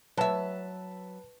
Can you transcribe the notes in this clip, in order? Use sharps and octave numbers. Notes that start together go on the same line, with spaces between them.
F#3 B4 E5 A5